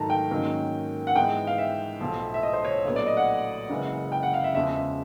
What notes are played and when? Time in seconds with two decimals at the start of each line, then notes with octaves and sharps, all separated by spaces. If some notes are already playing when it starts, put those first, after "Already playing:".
Already playing: G#2 D#3 F#3 A3 A5 A#5
0.10 G5
0.31 G#2 D#3 F#3 A#3 C#4
1.07 F#5
1.15 G#2 E3 G#3 B3 G5
1.47 F5
1.58 E5
2.00 B1 A2 F3
2.34 E5
2.43 D#5
2.53 C5
2.65 C#5
2.85 A#1 A2 F#3 B3
2.96 D5
3.07 D#5
3.17 F#5
3.70 F#1 F#2 C#3 E3 G#3
4.12 G5
4.23 F#5
4.34 F5
4.44 E5
4.55 E2 C#3 F3 G#3 E5
4.76 E5